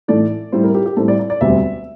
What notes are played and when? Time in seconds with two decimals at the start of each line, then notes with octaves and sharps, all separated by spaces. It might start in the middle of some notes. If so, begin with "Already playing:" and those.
0.08 A2 E3 A3 D5
0.52 A2 G3 C4 E4 C5
0.64 A#4
0.75 G4
0.86 G4
0.96 A2 G3 C4 E4 A4
1.08 D5
1.19 D5
1.30 D5
1.41 E1 D2 C3 G3 E5